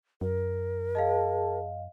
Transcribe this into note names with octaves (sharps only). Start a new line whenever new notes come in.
F#2 A#4
G#4 D#5 F5 A5